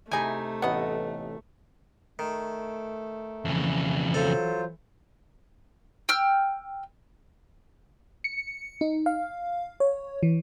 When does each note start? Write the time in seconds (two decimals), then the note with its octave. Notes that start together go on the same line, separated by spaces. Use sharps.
0.11 C3 A3 D#4 E4 G#4 G#5
0.62 A1 B3 D#5 F#5
2.19 D#3 A3
3.45 F2 C#3 E3
4.14 F#3 F4 A4 C5
6.09 G5 E6 F6
8.24 C#7
8.81 D#4
9.06 F5
9.80 C#5
10.23 E3